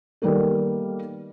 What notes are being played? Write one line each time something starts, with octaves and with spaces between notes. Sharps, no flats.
D#3 G3 A#3 B3 A4